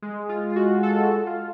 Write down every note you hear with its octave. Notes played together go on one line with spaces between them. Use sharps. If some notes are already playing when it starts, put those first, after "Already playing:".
G#3
F4
F4
F#4
A4
F4